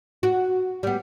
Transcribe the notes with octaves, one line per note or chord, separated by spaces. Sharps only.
F#4
G3 B3